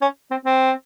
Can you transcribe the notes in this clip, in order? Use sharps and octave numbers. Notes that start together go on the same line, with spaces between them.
C#4
C4
C4